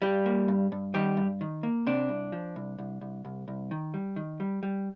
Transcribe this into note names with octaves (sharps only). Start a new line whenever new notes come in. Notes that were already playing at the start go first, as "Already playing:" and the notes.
G2 G3 G4
A#3
G2
G2
D#3 G3 G4
G2
D#3
A#3
C3 D4
C2
F3
C2
C2
C2
C2
C2
D#3
G3
D#3
G3
G3